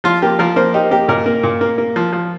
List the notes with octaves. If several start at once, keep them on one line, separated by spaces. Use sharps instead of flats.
F3 F4
A#3 G4
F3 A#4
A#3 C5
D#4 G4
A#3 G4
A#2 A#4
A#3
A#2
A#3
A#3
F3
F3